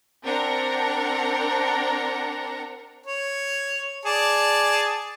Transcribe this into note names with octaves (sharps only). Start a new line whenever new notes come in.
C4 D4 A#4 F#5 A#5
C#5
G#4 D5 A5